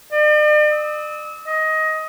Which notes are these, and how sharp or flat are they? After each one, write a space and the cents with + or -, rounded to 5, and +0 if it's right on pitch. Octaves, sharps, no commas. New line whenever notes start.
D5 +45
E6 -35
D#5 +15